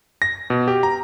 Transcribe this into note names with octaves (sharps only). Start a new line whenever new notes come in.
A#6
B2
G4
A#5